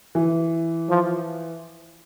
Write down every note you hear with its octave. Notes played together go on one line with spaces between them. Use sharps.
E3
F3